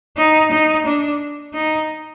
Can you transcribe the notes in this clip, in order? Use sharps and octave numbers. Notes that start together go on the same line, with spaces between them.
D#4
D#4
D4
D#4